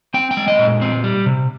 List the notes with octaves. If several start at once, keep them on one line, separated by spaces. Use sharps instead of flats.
C4 G5
G5
G#3
D#5
A#2
C4
G3
C3